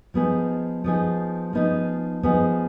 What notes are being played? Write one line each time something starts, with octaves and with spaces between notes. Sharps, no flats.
F3 B3 D#4 G#4
F3 B3 D#4 G#4
F3 B3 D#4 G#4
F3 B3 D#4 G#4